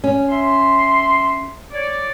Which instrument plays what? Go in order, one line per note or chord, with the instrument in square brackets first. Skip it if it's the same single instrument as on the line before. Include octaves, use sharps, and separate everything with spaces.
[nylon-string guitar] C#4
[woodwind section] E5 C6
C#5 D5